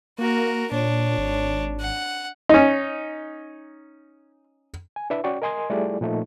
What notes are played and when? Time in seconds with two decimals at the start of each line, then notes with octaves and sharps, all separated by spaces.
0.18 A#3 F#4 A#4
0.72 A#2 D4 C#5
1.18 G#1
1.80 F#5
2.49 C#4 D#4
4.96 G#5
5.10 D4 E4 B4 E5
5.24 C#4 F#4 D5 G5 C#6
5.42 A#4 D#5 G#5 C6 D#6 G#6
5.70 G3 A3 E4 F4 G#4 D5
6.01 A#2 F3 A3 D#4